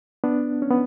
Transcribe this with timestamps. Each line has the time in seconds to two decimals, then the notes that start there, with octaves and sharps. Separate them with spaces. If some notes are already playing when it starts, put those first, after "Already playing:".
0.24 B3 D4
0.62 C#4
0.71 B3